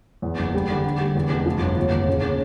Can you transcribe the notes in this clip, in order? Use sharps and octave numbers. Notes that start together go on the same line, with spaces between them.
E2
F#1
G3
D3
D3
G3
E2
F1
F3
G1
D#2
D#2
C#3
C#3